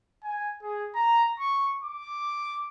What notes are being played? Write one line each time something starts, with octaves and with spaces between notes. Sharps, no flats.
G#5
G#4
A#5
C#6
D6